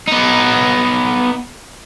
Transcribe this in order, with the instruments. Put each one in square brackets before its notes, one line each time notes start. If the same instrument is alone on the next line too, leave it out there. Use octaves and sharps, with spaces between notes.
[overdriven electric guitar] B3 D#4